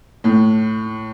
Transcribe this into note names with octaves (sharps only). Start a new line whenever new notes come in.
A2